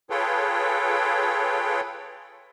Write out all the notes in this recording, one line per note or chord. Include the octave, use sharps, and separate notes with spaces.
F4 G#4 A4 B4 C#5 G5